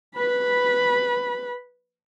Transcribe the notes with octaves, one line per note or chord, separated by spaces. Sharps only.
B4 B5